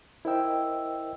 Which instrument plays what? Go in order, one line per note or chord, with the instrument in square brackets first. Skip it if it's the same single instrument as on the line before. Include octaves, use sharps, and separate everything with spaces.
[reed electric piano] E4 A#4 C5 D#5 G5 E6